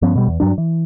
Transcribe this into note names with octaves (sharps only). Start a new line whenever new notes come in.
G2 F3 B3 C#4
B2 G3
E2
G2 F#3 D4
E3